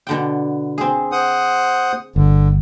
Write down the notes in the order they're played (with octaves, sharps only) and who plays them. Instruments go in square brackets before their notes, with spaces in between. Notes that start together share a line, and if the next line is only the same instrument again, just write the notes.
[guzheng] B2 D3 G5
C4 G#4
[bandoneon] C5 F#5 D#6
[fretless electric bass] G1 [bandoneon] D3